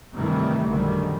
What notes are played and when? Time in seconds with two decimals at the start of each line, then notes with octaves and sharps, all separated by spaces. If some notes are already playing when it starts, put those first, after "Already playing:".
0.14 G2 C3 D#3 E3 G3 A3
0.68 A#1 F#2 D3 D#3 G3